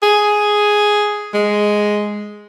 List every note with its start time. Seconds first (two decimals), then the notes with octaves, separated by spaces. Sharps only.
0.03 G#4
1.34 G#3